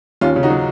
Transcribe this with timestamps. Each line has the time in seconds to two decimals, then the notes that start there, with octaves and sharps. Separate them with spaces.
0.21 D#2 C#4 F4
0.36 C#3
0.43 D#4 F#4
0.50 F#3